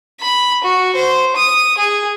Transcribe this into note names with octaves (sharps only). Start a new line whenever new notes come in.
B5
F#4
C5
D#6
G#4